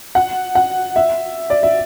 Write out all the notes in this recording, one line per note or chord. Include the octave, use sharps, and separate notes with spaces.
F#5
F#5
E5
D5
E5